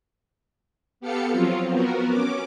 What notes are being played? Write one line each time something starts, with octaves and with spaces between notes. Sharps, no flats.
B3 G4 A4 F5 C#7
F3 F#3 C4 F4
B3 F#4 A#4
C#4 D6